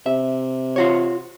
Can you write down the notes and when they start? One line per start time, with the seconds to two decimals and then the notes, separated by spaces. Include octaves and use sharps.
0.06 C3 E5
0.76 F4 F#4 C#5